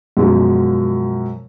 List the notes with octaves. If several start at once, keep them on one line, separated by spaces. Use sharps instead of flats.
F#2 B2 F3 G#3